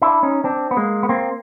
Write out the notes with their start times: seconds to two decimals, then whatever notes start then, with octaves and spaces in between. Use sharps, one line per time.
0.02 D4 E4
0.23 C#4 D#4
0.44 C4 D4
0.71 B3
0.77 G#3 A#3
1.03 B3
1.09 A#3 C4